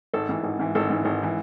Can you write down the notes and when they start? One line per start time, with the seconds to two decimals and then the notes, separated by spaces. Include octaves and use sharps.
0.14 G#1 A4
0.29 G#2 E3
0.44 G#1
0.59 G#2 E3
0.75 G#1 A4
0.90 G#2 E3
1.05 G#1
1.23 E3